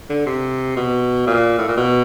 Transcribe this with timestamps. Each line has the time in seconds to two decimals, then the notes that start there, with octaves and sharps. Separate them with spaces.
0.10 D3
0.26 C3
0.77 B2
1.27 A#2
1.58 A2
1.68 A#2
1.77 B2